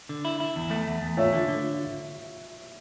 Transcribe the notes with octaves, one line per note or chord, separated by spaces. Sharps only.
D3
E4
E4
E2
A3
E2
E2
A3 C#5 E5
D3
D3